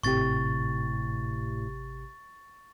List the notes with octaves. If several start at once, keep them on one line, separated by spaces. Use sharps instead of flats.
G#1 A2 C3 G4 C#6 A6